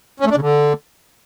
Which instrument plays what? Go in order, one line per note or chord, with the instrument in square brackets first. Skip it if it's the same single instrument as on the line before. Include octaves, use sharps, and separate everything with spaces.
[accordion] C#4
A3
D4
C#3
D3